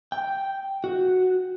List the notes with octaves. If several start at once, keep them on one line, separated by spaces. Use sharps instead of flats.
G5
F#4